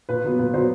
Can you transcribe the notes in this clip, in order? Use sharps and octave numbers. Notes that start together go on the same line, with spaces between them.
A#2 B4
F#3 B3
A#2 B4
F#3 B3 C5